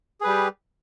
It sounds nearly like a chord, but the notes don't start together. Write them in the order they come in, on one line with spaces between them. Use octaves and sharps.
G#4 B4 G3 G4